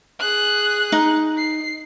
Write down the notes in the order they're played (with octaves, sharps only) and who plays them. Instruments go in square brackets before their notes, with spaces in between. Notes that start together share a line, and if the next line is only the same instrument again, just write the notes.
[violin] G#4 F#6
[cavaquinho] D#4
[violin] C7